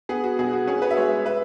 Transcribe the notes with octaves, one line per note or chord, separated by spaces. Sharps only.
B3 G#4
F#4
B2 G#4
F#4
C#4 G#4
F#4 B4
E5
G#3 G#4 C#5
B4 E5